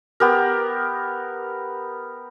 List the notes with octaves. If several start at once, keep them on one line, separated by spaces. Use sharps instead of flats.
B3 G4 A#4